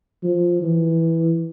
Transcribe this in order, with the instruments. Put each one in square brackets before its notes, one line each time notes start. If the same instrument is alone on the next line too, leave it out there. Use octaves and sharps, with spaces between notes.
[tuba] F3
E3